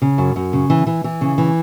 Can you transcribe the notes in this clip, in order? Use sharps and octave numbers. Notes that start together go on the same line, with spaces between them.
C#3
F#2
F#2
C#3
E3
E3
E3
C#3
E3